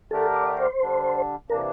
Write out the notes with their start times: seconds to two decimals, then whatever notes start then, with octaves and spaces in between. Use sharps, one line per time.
0.11 D3 A3 D4 G4 A4 A#4
0.34 D5
0.57 C5
0.80 D3 G3 D4
1.50 C3 E3 A#3 D4 A#4